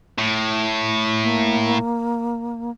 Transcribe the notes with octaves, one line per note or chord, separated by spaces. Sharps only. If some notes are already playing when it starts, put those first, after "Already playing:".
A2
A#3